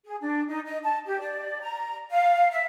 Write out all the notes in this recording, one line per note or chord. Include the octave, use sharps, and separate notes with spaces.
G#4
D4
D#4
D#5
A5
G4
D5
A#5
F5
E5